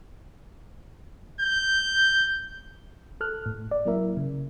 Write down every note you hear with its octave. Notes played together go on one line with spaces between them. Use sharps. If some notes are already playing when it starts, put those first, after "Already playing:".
G6
A4 F6 F#6
A2
D5
F#3 A#3 E4 A#4 E5
C#3